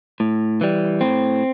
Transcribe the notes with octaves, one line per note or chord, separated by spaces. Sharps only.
A2
E3 G3
A2 C4